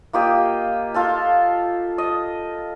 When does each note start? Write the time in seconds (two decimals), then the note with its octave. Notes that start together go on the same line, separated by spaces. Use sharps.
0.13 A#3 F4 G4 D#5
0.94 F4 A4 A5
1.98 D#5